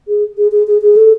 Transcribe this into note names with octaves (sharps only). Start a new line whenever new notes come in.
G#4
G#4
G#4
G#4
G#4
A4